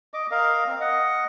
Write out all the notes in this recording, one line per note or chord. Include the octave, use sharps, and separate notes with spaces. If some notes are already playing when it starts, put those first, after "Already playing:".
D#5 D6
A#4 D#5 F5
C4
D#5 F#5